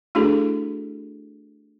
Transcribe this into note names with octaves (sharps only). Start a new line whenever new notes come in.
A3 D4 E4 F#4 G#4 A4